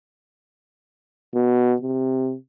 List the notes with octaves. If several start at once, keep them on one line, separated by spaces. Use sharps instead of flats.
B2
C3